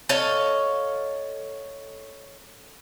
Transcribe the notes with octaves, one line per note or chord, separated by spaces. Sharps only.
A4 C#5 D#5 F5